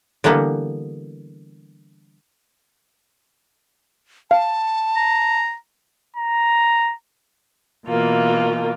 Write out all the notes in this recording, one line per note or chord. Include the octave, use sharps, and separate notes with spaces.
D3 E3 G3 A#3 B3
F5 A5
A#5
A#5
B2 E3 A#3 F4